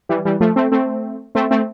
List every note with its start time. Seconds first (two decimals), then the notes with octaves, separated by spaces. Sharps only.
0.09 E3 G3
0.25 E3 G3
0.40 F3 A3
0.56 A3 C4
0.72 A3 C4
1.35 A3 C4
1.51 A3 C4